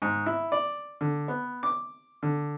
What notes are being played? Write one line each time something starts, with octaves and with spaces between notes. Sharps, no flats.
G#2
E4
D5
D3
B3
D6
D3